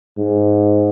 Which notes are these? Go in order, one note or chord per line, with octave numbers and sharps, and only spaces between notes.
G#2